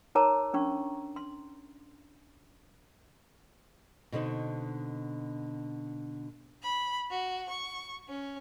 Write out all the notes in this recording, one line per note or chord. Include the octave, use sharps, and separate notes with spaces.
D#4 A#4 C#5 A5 A#5 D6
C#4 D4 C#6
C6
B2 D3 C4 D#4
B5
F#4
C#6
C#4